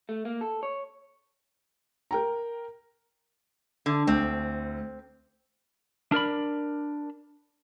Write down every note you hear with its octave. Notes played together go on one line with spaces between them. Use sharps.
A3
A#3
A4
C#5
A#4 G5 A#5
D3
D2 C4
D4 A#4 D5 B5